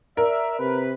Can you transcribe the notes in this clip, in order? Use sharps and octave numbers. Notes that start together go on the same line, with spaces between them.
A#4 D5 E5
C3 B4